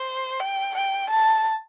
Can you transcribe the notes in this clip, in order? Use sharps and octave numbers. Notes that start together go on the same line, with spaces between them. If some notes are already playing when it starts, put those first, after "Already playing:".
Already playing: C5
G5
G5
A5